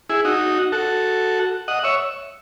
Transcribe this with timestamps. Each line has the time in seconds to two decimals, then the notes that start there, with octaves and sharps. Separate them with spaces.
0.09 E4 G#4
0.25 D#4 F#4
0.72 F#4 A4
1.68 D#5 F#5
1.84 C#5 E5